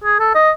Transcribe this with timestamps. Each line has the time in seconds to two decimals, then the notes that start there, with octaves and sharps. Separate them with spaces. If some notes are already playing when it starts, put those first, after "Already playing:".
0.04 G#4
0.19 A4
0.35 D#5